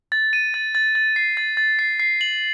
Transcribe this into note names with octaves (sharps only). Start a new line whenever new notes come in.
A6
D#7
A6
A6
A6
C7
A6
A6
C7
C7
F#7